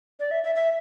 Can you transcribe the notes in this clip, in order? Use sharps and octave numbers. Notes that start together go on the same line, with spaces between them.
D5
E5
E5
E5